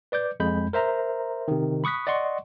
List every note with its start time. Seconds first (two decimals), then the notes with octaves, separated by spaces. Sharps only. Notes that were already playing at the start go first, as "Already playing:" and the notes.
0.12 B4 D5 D6 G6
0.40 F2 G#3 B5 G6
0.73 A#4 C5 E5 A#5
1.48 C3 D#3
1.84 B5 C#6 D#6 F#6 B6
2.07 D5 D#5 F#5 C6 C#6